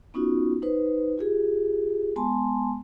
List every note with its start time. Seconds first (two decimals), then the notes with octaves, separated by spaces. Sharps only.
0.14 B3 C#4 D#4 F4 F#4
0.62 D#4 B4 C5
1.18 F4 G4 G#4
2.16 G#3 B3 G#5 A5 C6